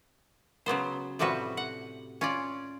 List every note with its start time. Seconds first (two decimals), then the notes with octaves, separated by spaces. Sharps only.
0.66 C#3 F#3 B3 C5
1.19 A2 C3 F3 G3 F#4 B4
1.57 F#5
2.21 C#4 F4 D5